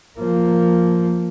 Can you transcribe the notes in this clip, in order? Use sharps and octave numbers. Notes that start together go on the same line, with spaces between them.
F3 A#3